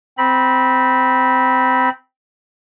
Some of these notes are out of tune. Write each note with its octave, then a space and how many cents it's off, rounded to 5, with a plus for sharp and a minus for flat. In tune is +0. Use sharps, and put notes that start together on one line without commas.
C4 -15 B5 -20